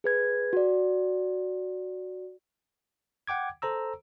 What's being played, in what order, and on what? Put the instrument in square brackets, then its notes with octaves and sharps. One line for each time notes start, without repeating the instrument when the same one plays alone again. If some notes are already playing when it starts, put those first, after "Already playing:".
[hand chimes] G#4 B4 G#6
F#4 D5
[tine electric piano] F#5 G5 D6 G#6
A4 C5 A#5 E6